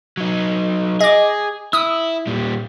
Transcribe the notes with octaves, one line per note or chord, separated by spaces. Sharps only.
F#3 D#4
G#4 D#5 D6
E4 D#6 E6
A#2 G3